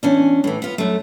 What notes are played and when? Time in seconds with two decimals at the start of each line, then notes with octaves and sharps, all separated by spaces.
0.03 E2 C#4 D4
0.44 A2 E3
0.62 B3 F4
0.78 F#2 A3